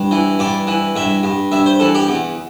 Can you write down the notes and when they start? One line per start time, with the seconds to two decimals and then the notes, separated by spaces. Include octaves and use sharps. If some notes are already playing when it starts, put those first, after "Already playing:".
Already playing: G2
0.11 E3
0.39 G2 D5
0.67 E3
0.96 G2 E5
1.23 G2
1.52 G2 E5
1.66 C5
1.80 E3 A4
1.95 G4
2.09 E2